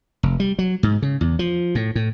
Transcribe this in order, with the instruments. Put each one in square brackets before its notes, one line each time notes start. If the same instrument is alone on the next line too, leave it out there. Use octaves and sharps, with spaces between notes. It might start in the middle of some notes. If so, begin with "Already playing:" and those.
[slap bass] F1
G3
F#3
G#2
C#3
E2
F3
A2
A2